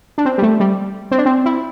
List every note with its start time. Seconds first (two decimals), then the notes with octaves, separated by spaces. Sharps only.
0.18 D4
0.25 C4
0.38 G3
0.42 A3
0.60 G3
1.11 C4
1.18 D4
1.26 C4
1.45 E4